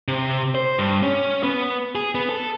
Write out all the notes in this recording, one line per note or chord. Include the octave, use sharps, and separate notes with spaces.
C3
C5
G2
C#4
B3
G#4
B3
A4